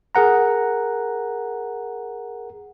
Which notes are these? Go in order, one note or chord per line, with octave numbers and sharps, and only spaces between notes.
G#4 A#4 F#5 A#5